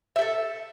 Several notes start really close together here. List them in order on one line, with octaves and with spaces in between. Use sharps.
E5 G4 A4